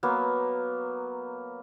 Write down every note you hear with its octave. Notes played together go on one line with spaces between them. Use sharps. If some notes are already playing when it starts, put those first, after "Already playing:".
F#3 A#3 B3